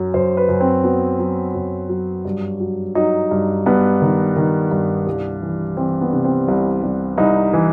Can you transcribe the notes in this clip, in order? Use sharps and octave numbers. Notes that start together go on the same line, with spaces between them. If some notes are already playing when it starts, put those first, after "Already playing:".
Already playing: F#2 F#3
F#2 C5
B4
F#2
C4
F#3 B3
F#3
F#2
F#3
G2
F#3
F#3 D#4
G2
G2 B3
D#3
D#3
G2
C2
E3
E3 C4
B3
C3
C4
C2
C2
C2 D#4
E3